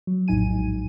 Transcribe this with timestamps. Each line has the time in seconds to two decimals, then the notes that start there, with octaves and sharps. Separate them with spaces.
0.07 F#3
0.28 A#1 F2 A2 D#4 G#5 D#7
0.56 G#2